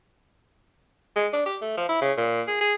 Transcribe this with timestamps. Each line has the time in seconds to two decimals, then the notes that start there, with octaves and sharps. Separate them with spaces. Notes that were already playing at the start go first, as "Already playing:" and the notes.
1.16 G#3
1.33 D4
1.46 G4
1.62 A3
1.77 F3
1.89 E4
2.01 C#3
2.17 A#2
2.47 G#4
2.61 G#4